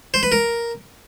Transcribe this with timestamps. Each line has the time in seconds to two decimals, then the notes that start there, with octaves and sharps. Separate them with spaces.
0.14 C5
0.23 B4
0.32 A#4